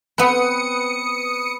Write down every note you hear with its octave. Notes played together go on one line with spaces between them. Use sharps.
B3 C4 B4 B5 D#6 C#7